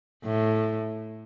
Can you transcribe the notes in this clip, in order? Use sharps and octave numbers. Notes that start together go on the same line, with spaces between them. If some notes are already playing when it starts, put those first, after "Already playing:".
A2